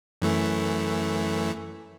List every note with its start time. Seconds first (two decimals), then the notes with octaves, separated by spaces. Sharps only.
0.22 F#2 E3 A3